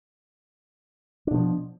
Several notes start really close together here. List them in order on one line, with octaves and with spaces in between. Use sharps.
D4 B2 F3